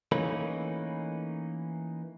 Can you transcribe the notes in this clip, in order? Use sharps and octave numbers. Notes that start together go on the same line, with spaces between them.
E3 A3 A#3 C#4 D#4 B4